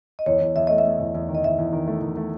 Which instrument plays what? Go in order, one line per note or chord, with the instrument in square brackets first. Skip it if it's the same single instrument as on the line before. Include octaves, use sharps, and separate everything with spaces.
[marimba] D#5
[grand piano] E2 [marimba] C#5
[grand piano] E2
[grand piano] E2 [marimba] E5
[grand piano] A3 [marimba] D#5
[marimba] E5
[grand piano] A3
E2
E2
D#3
[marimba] D#5
[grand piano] E2 [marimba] E5
[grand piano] E2
D#3
A3
D#3
A3